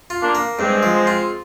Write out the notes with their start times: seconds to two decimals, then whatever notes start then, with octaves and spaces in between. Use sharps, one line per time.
0.10 F4
0.22 A#3 D4
0.35 A#3
0.58 G2 G#3 C4
0.83 F3
1.07 F4